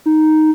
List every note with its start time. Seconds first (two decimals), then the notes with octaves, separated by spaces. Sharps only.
0.06 D#4